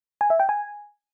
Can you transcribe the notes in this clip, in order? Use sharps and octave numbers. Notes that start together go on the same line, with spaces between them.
G#5
E5
G5
G#5